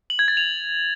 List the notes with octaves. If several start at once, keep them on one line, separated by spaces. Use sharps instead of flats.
F#7
G#6
A6
F7